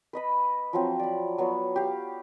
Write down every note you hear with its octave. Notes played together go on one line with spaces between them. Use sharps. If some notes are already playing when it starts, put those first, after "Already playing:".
B4 D#5 B5
F3 F#3 C4
D5 B5
F#3 B3 C#5
G4 F5